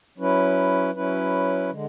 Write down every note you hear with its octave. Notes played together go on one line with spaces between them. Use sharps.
F#3 C#4 E4 B4
F#3 C#4 E4 B4
D3 G#3